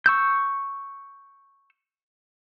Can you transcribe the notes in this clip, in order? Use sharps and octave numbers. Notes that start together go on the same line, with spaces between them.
C#6 E6 G6